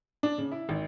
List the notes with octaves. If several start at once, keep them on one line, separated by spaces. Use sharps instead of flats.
D4
C#3
E4
G#1